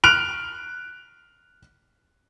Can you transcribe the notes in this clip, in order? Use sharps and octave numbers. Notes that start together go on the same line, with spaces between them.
F6 F#6 D7 F7